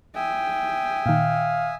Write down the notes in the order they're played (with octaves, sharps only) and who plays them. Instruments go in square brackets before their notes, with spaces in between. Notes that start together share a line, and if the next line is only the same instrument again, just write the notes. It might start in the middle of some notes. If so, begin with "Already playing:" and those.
[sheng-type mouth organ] E5 G#5 D#6 [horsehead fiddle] G5
[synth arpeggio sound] A#2 D#3 [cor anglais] F5